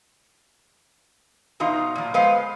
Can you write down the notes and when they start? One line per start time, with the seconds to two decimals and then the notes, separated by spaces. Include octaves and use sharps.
1.60 E2 B2 D#4 F4
1.95 A#2 F3
2.14 G#3 B3 B4 C5 F5